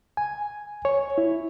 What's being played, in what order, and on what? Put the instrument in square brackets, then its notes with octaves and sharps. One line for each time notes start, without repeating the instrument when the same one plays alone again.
[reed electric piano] G#5
C#5
E4